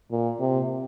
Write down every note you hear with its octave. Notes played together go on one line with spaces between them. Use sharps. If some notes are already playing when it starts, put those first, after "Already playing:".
A#2
C3